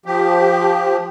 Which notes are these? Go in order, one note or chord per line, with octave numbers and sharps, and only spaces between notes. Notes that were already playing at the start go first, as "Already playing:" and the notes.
F3 G4